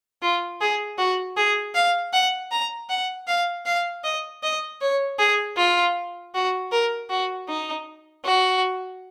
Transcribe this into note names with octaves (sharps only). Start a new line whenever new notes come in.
F4
G#4
F#4
G#4
F5
F#5
A#5
F#5
F5
F5
D#5
D#5
C#5
G#4
F4
F#4
A#4
F#4
D#4
F#4